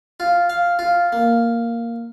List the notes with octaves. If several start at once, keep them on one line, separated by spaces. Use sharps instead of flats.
F4
F5
F4
A#3